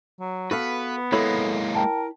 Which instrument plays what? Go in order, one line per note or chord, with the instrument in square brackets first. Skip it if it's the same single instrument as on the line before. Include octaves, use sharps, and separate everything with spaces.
[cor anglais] F#3
[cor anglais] B3 [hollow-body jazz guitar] F#4 A4 F5 [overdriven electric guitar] B4
[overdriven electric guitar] G#3 A#3 [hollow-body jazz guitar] E4 C#5 B5 [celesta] A4
[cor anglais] A#4 [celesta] G5 A5